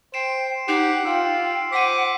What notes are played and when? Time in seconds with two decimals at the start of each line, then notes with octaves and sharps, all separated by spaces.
0.14 C5 G5 C7 D7 E7
0.68 D#4 G4 F#5 C7 D7 E7
1.05 F4 F5 G5 E6
1.73 C5 F#5 D6 B6 D#7